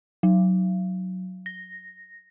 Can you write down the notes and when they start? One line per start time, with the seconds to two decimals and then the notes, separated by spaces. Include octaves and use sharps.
0.23 F#3
1.46 A#6